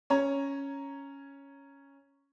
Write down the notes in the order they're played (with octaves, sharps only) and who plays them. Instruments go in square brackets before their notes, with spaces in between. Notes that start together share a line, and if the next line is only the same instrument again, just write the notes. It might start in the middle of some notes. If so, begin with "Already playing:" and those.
[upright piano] C#4 C#5 A#5